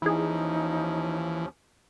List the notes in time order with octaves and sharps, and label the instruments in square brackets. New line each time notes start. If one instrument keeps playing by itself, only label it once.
[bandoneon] D#2 F3 C#4 [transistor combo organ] E3 [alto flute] D#4 [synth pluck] E4 G#4